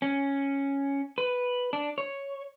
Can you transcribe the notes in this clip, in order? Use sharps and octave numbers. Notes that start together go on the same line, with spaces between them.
C#4
B4
D4
C#5